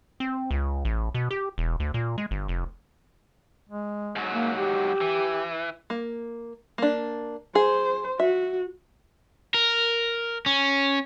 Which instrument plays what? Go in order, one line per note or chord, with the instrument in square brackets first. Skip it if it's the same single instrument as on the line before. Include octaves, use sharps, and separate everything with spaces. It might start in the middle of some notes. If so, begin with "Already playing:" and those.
[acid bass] C4
C#2
A1
B2
G4
E1
D2
A#2
G#3
G1
F1
[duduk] G#3
[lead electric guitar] G#2 F#3
[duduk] A#3
G4
[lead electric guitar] E3
[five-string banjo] A#3
A#3 D4
[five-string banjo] G#4 [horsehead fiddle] C5
[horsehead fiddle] F#4 [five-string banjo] E5
[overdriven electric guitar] A#4
C#4